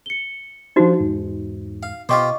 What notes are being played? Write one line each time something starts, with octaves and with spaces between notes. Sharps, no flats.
C#7 G7
F3 D4 D#4 F#4 C5
E2 G#2
F5
B2 F4 G4 C5 D#5 C#6 D6